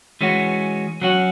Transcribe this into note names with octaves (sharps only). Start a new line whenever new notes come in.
E3 G#3 C#4 F#4
F#3 C#4 F#4